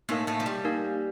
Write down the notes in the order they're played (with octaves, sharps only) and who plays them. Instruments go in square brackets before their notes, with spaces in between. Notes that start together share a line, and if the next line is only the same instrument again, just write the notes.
[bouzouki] A2 A3 [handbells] A#3 D#4 A#4 F5
[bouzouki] A2 A3
F3
G3
[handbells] A#3 D#4 A#4 F5